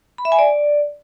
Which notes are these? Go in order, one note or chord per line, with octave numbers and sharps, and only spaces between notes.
B5
E5
G#5
D5